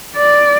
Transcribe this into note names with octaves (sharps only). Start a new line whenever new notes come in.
D5